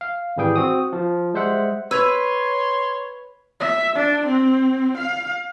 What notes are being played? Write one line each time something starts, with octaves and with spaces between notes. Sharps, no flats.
F5
G#1 E3 G3 G#4 G5
C4 F#4 D#6
F3
G3 G#3 C5 E5 F#5
B4 C#5 C6 E6 G#6 F7
E5
D4
C4
F5